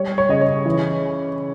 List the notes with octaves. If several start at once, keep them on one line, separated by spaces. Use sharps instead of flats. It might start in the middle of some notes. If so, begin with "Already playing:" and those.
Already playing: G3 C#5
C#5
C#3 D#5
C#5
E3